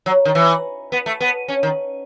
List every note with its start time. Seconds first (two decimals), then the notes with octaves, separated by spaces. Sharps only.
0.06 F#3
0.25 D#3
0.35 E3
0.92 B3
1.06 A3
1.20 B3
1.48 C#4
1.63 D#3